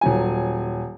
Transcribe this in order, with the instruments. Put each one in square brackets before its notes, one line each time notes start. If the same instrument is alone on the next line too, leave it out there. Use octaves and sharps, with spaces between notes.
[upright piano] D#1 F#3 G#5